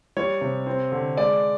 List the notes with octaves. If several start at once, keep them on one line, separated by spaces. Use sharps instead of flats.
G3 C#5
C3
C4
D3
G#3 D5